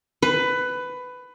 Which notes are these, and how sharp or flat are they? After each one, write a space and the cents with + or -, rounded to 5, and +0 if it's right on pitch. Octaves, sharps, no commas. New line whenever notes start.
B4 +15